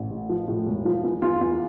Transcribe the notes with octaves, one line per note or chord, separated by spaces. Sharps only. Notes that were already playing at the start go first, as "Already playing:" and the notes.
Already playing: A1
A2
F3
A2
E1
F3
E2
E2 F4
E2